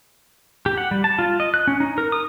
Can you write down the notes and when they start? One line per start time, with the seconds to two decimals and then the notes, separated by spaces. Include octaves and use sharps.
0.66 G4
0.78 F#5
0.91 G3
1.04 A5
1.19 F4
1.40 D#5
1.54 F#6
1.67 C#4
1.80 D#4
1.98 A#4
2.12 D#6